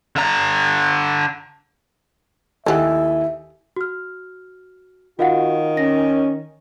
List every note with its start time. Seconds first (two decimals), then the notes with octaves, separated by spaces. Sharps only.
0.16 D3 A#5
2.66 D#2 D#4 E4 G4 A4 E5 F#5 G#5
3.76 F#4 F6
5.19 D#3 F4 F#4 F5 F#5
5.77 C#4 A#6